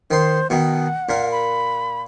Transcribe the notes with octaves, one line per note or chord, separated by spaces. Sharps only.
D#3 C5 C6
B2 D#3 F#5
A#2 A#4
B5